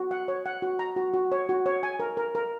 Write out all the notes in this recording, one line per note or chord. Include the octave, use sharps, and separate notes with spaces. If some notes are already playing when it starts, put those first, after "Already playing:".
Already playing: F#4
F#5
C#5
F#5
F#4
A#5
F#4
F#4
C#5
F#4
C#5
G#5
A#4
A#4
A#4